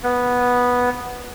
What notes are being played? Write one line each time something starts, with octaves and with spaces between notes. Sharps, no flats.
B3